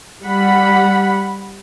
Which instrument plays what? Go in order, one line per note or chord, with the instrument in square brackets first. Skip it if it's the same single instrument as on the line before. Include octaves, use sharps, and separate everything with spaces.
[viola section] G3 F#5 B5